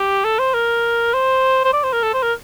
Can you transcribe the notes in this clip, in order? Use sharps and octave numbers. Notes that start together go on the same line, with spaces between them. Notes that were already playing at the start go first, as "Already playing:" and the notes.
Already playing: G4
A4
C5
A#4
C5
C5
D5
C5
A#4
A4
C5
A#4